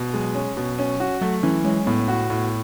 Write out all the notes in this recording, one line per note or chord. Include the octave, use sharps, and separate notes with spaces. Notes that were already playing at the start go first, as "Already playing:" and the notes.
Already playing: B2
F#3 G#3
C#4
B2
C#4
F#4
F#3 A3
E3 C#4
G#3 C#4
A2 B3
F#4
A2